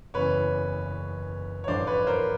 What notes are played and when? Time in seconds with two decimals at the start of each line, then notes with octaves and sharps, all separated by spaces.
0.14 F#1 E2 C#3 E3 B4 C#5
1.64 C#5
1.68 A1 G2 D3 F3 C5 D5
1.87 B4 C#5
2.07 A#4 C5